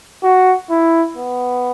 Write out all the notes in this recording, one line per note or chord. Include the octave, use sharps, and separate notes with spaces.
F#4
E4
B3